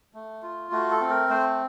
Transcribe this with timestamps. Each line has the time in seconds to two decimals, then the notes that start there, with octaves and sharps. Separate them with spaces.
0.14 A3
0.43 F4
0.71 A3 F#4
0.90 A4
1.00 C4
1.10 A#4
1.29 A3 C5